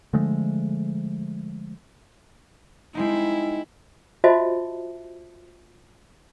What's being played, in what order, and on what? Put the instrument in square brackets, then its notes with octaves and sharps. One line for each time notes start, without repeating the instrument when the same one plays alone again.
[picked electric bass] D3 F3 G#3 A3
[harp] G#3 C4 D#4 [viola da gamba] E4
[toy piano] F4 F#4 C5 D#5 E5 A5